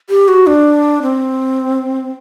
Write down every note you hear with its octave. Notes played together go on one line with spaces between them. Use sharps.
G4
F#4
D4
C4